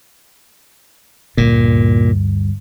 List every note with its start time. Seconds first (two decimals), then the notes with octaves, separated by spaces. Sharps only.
1.37 D2 G2 A#2